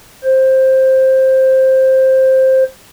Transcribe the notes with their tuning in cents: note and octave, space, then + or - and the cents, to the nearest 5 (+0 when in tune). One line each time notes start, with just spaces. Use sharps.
C5 +10